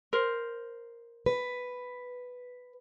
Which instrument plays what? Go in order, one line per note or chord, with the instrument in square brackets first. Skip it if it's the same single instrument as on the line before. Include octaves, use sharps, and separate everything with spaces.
[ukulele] A#4 C5
[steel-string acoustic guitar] B4